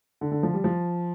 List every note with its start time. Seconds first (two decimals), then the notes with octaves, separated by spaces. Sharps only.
0.21 D3
0.32 D3
0.43 F3
0.54 G3
0.64 F3